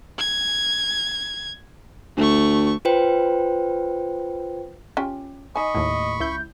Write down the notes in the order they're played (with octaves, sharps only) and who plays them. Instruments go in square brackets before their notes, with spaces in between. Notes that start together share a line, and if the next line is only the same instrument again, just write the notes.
[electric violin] G#6
[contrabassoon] D2 [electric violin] A3 C#6
[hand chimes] F4 B4 C5 G5
[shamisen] C#4 F4 G4
[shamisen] D#4 G#5 [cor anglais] D#5 [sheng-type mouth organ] B5 C#6
[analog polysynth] D#2 A2
C#2 E4 G6